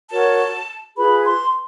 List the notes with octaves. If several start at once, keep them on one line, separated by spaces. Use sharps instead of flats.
F#4 A#4 C#5 A5
F4 G#4 B4 B5
C6